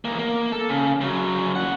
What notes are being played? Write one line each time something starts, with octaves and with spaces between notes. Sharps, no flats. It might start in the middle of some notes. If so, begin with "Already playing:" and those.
E2 A#3
A#3
A4
C#3
C#3 F#3
A#3 F#5